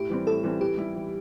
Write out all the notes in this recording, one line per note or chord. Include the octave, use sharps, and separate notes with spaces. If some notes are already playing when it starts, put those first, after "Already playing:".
Already playing: A2 G4
E3 G3 C4
A2 A4
E3 G3 C4
E3 G4
G3 E4
E3